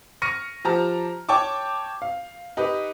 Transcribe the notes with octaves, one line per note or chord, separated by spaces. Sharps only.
C#6 F6 A#6 C#7 D#7
F3 G4 A5 A#5 F6
C#5 G5 A5 C#6 D6
F5
D#4 G4 B4